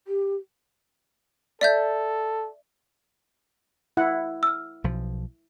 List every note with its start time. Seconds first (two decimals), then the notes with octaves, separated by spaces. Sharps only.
0.07 G4
1.61 A4 D5 E5 G6
3.97 E4 F#5
4.43 E6 F6
4.84 B1 F3